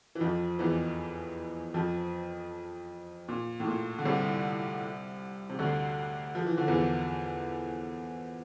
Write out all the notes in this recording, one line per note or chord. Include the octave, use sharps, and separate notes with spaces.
E3
F2 F3
E2 E3
F2 F3
A#2
A2
A#2
D3
C2 C3
C3
D2 D3
F3
E3
D3
E2 E3